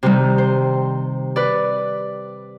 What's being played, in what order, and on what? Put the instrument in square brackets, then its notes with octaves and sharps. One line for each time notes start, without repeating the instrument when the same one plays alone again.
[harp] C3 D#3 G3
C5
B4 D5